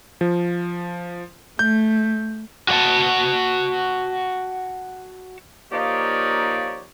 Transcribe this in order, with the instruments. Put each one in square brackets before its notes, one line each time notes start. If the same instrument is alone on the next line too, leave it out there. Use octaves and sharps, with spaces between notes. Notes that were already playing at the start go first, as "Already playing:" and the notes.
[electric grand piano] F3
[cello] A3 [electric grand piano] G6
[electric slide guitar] F#4 G4 D5 F#5 A5
[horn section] F3 A#3 D#4 G4 C#5 D5